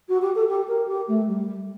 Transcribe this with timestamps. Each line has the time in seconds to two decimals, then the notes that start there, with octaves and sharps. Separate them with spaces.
0.09 F#4
0.22 G4
0.35 A4
0.49 G4
0.68 A#4
0.88 G4
1.08 A3
1.27 G3